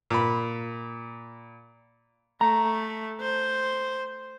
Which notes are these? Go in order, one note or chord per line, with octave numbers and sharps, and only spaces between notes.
A#2 B5
A3 A#5
C5